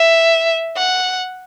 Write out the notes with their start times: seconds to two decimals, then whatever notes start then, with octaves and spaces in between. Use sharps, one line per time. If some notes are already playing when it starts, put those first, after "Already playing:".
Already playing: E5
0.76 F#5